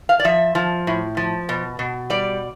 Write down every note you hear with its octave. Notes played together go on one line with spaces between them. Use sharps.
F5
D5
F3 E5
F3
A2
F3
B2
B2
G3 D5